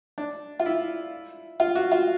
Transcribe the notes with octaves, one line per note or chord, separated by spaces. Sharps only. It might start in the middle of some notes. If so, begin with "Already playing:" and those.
D4
F4
E4
F4
F#4
F4